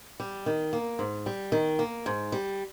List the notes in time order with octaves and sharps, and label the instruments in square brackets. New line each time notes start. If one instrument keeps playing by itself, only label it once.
[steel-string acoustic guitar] G3
D#3
A#3
G#2
G3
D#3
A#3
G#2
G3